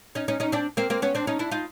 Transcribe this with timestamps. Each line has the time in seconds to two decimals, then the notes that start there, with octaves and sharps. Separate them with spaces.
0.15 C#4 D#4
0.28 C#4 D#4
0.40 C#4 D#4
0.52 C4 D4
0.77 A#3 C4
0.90 A#3 C4
1.02 B3 C#4
1.15 C4 D4
1.27 C#4 D#4
1.39 D4 E4
1.51 D#4 F4